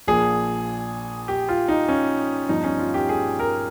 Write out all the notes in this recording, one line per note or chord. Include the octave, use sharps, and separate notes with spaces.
A#1 A#2 F3 G#4
G4
F4
D#4
C#4
G1 G2 F3 D#4
C#4
F4
G4
G#4
A#4